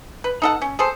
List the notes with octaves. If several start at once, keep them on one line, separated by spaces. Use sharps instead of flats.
B4
D#4 A4 F#5
C#4
G#4 A4 C5